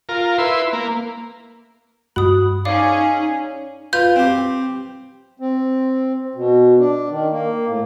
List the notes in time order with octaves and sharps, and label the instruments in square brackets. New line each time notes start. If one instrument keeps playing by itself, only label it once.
[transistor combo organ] F4 A#4
E4 B4 C6
A#3
[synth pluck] G2 F#4 F#6 [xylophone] B5 D#6
[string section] C#4 G#4 [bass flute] D#4 [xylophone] D5 F5 D6
[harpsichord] F4 B4 [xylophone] G6
[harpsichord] C4 G4
[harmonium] C4
B2
D4
D#3
A#3
A2